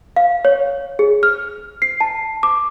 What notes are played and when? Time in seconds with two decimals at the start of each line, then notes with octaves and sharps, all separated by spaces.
0.16 F5
0.45 C#5
0.99 G#4
1.23 F6
1.82 C7
2.01 A5
2.43 D6